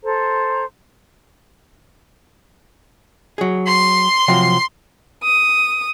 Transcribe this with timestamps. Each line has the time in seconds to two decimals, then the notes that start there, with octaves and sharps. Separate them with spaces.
0.04 A4 C5 A#5
3.38 F#3 G#4
3.68 C6
4.28 C3 F3 F#3
5.23 D#6